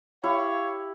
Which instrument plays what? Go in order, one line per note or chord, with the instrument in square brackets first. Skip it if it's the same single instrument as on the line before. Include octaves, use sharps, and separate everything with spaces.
[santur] E4 G4 [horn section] C#5 F5